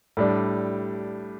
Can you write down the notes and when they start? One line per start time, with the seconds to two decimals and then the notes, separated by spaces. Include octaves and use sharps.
0.17 A2 G3 D4